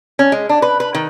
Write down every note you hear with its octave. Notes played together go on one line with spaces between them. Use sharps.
C#4
G#3
D4
B4
B4
D#3